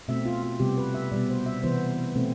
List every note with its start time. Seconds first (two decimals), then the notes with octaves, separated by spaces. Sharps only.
0.08 B2 A3 C4 E5
0.26 F4
0.43 F4
0.60 C3 G3 B3 G4
0.78 B4
0.94 E5
1.12 B2 G3 B3 D5
1.29 C5
1.46 E5
1.63 C3 E3 B3 C5
2.15 B2 A3 C4